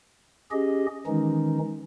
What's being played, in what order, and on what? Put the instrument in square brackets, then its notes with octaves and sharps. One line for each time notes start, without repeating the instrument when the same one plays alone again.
[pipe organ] C#4 G4 G#4 D#5
D#3 E3 G#3 C#4 D#4